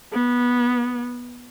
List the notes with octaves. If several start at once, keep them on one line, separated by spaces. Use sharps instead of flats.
B3